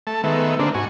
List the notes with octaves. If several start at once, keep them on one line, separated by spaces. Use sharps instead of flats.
A3 A5
D#3 G#3 A3 B3 E5
D3 G#3 A#3 C4 D4
G#2 F#4 G#5 C#6